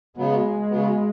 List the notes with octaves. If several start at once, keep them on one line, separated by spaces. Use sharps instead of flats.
C#3 F#3 G#3 B3
C#3 F#3 B3